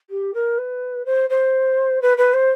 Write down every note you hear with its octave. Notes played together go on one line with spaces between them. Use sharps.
G4
A#4
B4
C5
C5
B4
B4
C5